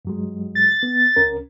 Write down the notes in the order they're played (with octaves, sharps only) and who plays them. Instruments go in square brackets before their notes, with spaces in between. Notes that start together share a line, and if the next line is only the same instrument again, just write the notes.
[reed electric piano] G2 F#3 G#3
[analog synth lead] A6
[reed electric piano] B3
C#2 C#4 A#4